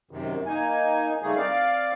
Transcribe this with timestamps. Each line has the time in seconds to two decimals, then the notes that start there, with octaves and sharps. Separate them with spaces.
0.11 F#2 C3 D#3
0.46 A#3 D#4 G#5
1.23 C#3 G3 A3 A#3 D#4 G#4
1.36 C4 D5 F5